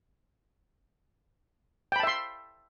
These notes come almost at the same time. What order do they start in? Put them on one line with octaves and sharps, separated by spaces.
G5 B5 A5 E5 C6